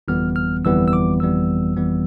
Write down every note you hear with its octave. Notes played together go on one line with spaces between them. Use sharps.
G1 F2 E3 G3 B3 F6
F6
G1 F2 E3 G3 B3 E6
E6
D6
G1 F2 E3 G3 B3 E6
G1 F2 E3 G3 B3